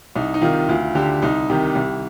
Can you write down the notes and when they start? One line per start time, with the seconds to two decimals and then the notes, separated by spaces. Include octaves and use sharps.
0.15 C2 D#4
0.34 D#4
0.41 C3 D#3 F4
0.69 D2 F4
0.95 D3 G4
1.22 C2 D#4
1.49 C3 D#3 G4
1.75 C2